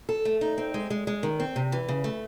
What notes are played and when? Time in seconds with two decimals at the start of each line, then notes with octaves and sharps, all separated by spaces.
0.09 A4
0.25 A3
0.41 D#4
0.58 C4
0.74 G#3
0.90 G#3
1.07 G#3
1.23 D#3
1.40 C4
1.56 C3
1.72 E3
1.89 C#3
2.04 A3